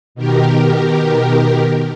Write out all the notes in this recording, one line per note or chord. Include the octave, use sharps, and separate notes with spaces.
B2 D#3 G4 A#4